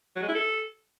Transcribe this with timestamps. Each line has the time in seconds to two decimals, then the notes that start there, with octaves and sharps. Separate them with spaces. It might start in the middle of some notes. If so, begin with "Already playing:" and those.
0.16 F#3
0.22 G#3
0.29 E4
0.35 A4